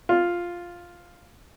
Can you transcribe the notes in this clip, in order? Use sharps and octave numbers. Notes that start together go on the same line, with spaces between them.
F4